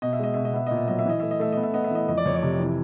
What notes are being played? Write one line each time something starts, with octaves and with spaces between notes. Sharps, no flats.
B2 D#5
E5
G#3 D#5
B2 E5
D#5
B3 E5
A#2 D#5
E5
F#3 D#5
E5
E3 D#5
A3 E5
D#5
A3 E5
B3 D#5
E5
B3 D#5
E5
E3 D#5
F2 D#5
D5
F2 C#5
D5
C3
E3